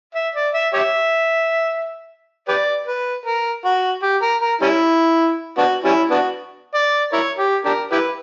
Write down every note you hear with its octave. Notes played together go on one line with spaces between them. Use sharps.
E5
D5
E5
G4 C#5 E5
G4 B4 D5
B4
A#4
F#4
G4
A#4
A#4
G3 C#4 E4
B3 D4 F#4
G3 C#4 E4
B3 D4 F#4
D5
E4 A#4 C#5
G4
D4 G4 A#4
E4 G4 B4